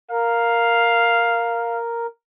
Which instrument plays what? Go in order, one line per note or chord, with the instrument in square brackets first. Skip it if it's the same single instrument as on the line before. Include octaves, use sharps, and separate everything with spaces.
[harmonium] A#4 [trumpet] F5